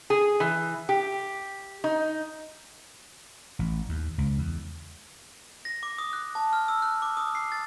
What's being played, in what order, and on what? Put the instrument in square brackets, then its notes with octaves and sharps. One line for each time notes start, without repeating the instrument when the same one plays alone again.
[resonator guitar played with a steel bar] G#4
E3
G4
D#4
[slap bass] A1
D#2
C#2
E2
[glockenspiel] A#6
D6
D#6
F#6
A5
F6
E6
F#6
D6
D#6
C7
A6